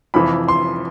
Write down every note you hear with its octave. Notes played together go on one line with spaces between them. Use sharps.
F1 F2 E3 B5
C6